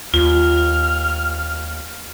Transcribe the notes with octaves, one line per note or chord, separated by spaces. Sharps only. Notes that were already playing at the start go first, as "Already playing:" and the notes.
D#2 F4 F6